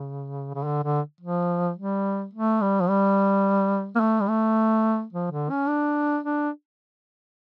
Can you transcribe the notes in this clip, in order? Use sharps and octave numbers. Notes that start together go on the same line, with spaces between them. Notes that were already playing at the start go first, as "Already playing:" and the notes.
Already playing: C#3
C#3
D3
D3
F3
G3
A3
G3
F3
G3
A#3
A3
G3
A3
F3
D3
C#4
D4
D4